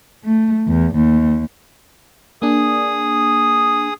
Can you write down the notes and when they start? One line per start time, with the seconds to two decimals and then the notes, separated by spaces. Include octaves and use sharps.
0.24 A3
0.68 E2
0.96 D#2
2.42 A#3 D4 G#4 D#6